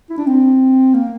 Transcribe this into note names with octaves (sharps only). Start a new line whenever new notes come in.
E4
D4
C4
A#3